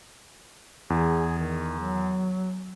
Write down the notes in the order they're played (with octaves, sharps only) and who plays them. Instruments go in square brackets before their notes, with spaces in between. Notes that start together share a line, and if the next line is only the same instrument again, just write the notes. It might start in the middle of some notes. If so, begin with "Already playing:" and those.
[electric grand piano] E2 [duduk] G#4
[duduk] D#3
F#3